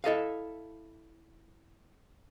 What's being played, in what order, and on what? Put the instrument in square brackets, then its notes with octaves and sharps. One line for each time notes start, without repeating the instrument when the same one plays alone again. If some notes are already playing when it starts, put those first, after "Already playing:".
[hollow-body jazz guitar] E4 A4 D#5 F5